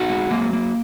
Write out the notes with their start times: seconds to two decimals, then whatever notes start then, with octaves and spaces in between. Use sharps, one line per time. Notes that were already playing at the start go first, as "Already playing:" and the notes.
Already playing: D#4 F#4
0.09 G#3
0.31 F#3 A#3
0.53 A#3